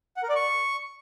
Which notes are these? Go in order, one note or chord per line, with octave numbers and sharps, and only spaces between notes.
F#5
A#4
D5
C#6